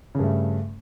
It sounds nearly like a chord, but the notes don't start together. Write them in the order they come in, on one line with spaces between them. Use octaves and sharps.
C#3 G2 A3